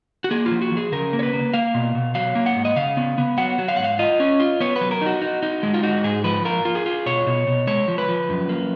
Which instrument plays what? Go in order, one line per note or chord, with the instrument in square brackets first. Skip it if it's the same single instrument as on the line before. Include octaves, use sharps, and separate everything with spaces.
[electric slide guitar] F#4
A#3 G#4
F4
F3
F#4
F3
G#4
C#3 A#4
A#3
C#5
B4
A#3
A#3 F5
B2
B2
F#3 F5
A#3
F#5
G#2
D#5
C#3 F5
B3
B3
F#3 F#5
F#3
F5
G#2 F#5
F5
F4 D#5
C#4
F4
B3 C#5
B4
F#3
A#4
D#4 F#4
D#4
D#4
G#3
F4
D#4 F#4
G#2 G#4
F3 B4
F4 A#4
F4
G#4
F4
B2 C#5
B2
B2
G#3 C#5
F3
B4
F3
F#2
A#3